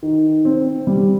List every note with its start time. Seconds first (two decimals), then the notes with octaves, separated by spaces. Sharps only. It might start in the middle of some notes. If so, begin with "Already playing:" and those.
0.03 D#3
0.45 C4
0.87 G3